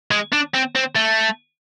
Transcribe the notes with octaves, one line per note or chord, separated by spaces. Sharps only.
G#3
D4
C4
C4
A3